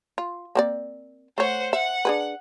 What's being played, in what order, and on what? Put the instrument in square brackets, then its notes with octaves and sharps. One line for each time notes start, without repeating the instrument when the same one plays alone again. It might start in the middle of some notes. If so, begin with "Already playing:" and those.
[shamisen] F4
A#3 C4 D5
[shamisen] A3 C#5 [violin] C5 F#5
[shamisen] E5 [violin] F#5
[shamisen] D4 G#4 B4